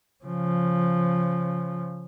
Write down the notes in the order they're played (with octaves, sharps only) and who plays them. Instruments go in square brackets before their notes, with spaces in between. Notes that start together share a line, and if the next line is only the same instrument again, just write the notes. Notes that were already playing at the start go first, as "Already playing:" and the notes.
[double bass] C#3 F3